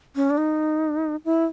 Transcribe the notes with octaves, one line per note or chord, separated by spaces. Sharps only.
C#4
D4
D#4
E4